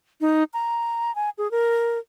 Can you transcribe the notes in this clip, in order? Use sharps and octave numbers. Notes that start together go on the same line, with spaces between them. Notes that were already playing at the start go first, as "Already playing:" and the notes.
D#4
A#5
G#5
G#4
A#4